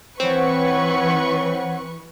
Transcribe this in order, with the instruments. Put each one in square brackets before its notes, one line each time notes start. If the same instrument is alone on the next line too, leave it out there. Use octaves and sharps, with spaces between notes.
[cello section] E3 [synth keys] C4 [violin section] B4 C#6 [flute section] C#5 F#5